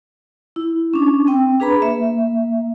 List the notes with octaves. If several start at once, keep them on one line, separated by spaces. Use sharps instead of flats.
E4
C#4 D4
C4 G5
D4 G#4 B4 A#5 B5
A#3 E5